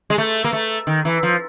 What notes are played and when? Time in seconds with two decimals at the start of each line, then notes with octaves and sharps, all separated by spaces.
0.10 G#3
0.18 A3
0.44 A#3
0.53 A3
0.87 D#3
1.05 E3
1.23 F3